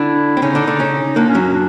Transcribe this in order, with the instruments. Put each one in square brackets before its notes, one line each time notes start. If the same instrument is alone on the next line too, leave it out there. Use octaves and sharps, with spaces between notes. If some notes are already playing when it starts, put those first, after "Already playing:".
Already playing: [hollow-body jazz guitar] D3 D4 [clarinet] E4
[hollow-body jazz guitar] C4
[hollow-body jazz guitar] C#3 C#4 [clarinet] D#4
[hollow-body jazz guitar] D3 D4
D3 D4
C#3 C#4
[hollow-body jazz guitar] A#2 A#3 [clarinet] D4
[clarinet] C#4
[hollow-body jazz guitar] F#2 F#3
[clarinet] C#4
D4